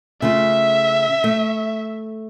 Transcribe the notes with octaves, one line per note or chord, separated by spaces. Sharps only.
C#3 A3 F4 E5
A3